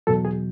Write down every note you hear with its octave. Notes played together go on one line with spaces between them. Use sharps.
E2 B2 F#3 A4
G#4